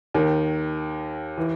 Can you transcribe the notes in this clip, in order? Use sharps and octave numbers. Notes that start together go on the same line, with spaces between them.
D#2 D#3
E3